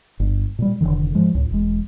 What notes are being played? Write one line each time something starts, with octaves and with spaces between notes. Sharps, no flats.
G1
A#2 G3
F1 B2 D3 D#3
G#2 F3 G#3
C#2 A2
E1 G#3